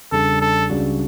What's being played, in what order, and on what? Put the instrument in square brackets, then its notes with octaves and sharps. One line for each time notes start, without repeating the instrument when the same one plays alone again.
[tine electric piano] E2 C#3 G3 D4 [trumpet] A4
[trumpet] A4
[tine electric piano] C#2 C#3 G3 D4 F#4